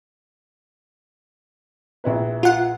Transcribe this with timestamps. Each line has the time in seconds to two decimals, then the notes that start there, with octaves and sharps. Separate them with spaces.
2.04 A#1 E4 B4
2.43 F4 F#5